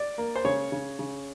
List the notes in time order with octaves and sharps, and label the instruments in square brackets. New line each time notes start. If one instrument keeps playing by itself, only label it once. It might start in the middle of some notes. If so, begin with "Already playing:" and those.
Already playing: [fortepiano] D5
A#3
C5
C#3 C#5
C#3
C#3